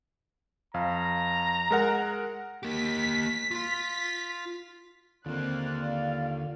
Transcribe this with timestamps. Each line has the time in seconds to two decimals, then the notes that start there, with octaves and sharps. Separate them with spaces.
0.74 F2 F5 A#5
1.71 G#3 A#4 F#5
2.63 A#3 G4 B6
3.51 F4 C6
5.26 D#2 D3 A#3 C4 F4 F#6
5.80 D5 F5